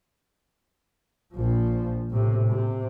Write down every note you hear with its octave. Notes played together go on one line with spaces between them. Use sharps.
A#1 F3
A2 C3
C3